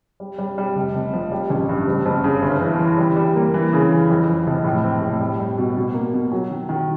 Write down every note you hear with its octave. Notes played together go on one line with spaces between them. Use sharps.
G3
G3
G3
F1
F1
F3
G3
A1
G2
F#1
F#1
C#3
G1
E3
E3
G3
G3
A#3
E3
C#3
E3
F2
F3
F1
A2
C4
A2
G3
G3
B2
B2
A#3
B2
F#3
D#3
D#3